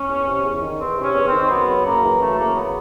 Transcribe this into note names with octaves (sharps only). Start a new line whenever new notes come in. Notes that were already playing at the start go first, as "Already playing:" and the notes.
Already playing: C#4
E2
C3
E2
D#3
E2 C4
C3
C#4
E2
C4
D#3
F#2 B3
C#3
F#2 A#3
E3
F#2 A3
C#3 A#3
F#2 B3